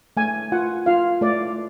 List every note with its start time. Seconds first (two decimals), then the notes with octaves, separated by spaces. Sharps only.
0.17 A3 G#5
0.52 F4 F#5
0.86 F4 F5
1.21 A3 D5